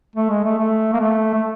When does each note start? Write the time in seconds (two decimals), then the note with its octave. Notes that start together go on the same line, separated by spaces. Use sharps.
0.16 A3
0.30 G#3
0.44 A3
0.59 A3
0.93 A#3
1.00 A3
1.34 A3